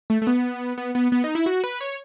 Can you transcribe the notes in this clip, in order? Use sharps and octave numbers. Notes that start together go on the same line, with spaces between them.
A3
A3
B3
B3
B3
B3
D#4
E4
F#4
B4
C#5